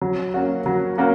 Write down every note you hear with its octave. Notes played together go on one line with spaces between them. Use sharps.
F#3
A#3 C#4 F#4
F#3
A#3 C#4 F#4